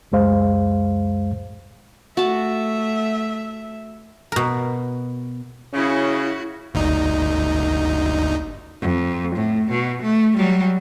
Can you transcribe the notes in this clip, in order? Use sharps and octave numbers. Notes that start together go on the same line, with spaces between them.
C#2 F#2 G#3 C5 F5
A3 F#4 E5 A5
B2 A#4
C#3 C#4 E4 F#4
G1 D2 D#4
F2
A2
B2
A3
F#3 G3